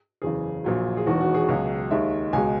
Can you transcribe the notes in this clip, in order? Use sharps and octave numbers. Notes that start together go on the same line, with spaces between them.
F#1 E2 C#3 G#4
A#1 A#2 F#3
G#4
E1 E2 D#3 F#4
F#4
G#4
C#2 B2 F#3
D#2 D#3 G#3 E5
C#2 B2 G#3 G#5